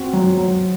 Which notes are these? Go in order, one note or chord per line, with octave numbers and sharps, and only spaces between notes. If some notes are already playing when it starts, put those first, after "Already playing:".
Already playing: C4 F#4
F#3
F#3